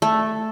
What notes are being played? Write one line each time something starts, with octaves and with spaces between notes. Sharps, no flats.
A3